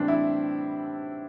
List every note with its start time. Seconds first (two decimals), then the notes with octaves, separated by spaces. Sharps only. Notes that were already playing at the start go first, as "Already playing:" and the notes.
Already playing: A2 E3 G3 C4 D4 C5
0.08 E4